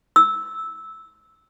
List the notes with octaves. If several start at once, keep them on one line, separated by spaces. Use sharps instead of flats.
E6